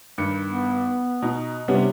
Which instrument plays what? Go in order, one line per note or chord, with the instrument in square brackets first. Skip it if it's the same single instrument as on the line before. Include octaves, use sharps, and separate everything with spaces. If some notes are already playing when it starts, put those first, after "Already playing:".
[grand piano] G2 D#3 C#7
[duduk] B3
[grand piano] B2 [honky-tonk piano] D#4
[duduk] C3 [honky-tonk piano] G3 B3 C#4 [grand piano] D4